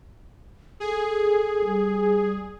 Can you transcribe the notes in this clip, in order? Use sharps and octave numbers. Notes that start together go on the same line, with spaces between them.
G#4 A4
G3